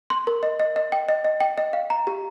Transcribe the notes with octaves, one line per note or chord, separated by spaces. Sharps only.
C6
A#4
D#5
D#5
D#5
G5
D#5
D#5
G5
D#5
F5
A#5
G4